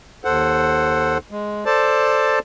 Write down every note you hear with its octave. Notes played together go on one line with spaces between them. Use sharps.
D#2 A4 C5 F#5
G#3
A4 C5 D5 A5